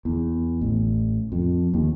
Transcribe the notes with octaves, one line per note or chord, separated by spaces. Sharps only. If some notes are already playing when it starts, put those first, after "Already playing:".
E2
A1
F2
D#2